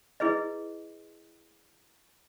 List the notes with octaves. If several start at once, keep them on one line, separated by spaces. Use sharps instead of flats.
E4 G#4 B4 D#5